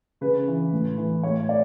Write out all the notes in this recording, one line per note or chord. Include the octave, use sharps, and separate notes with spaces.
C#3 B4
E3
A2
E3
A2 C#5
D5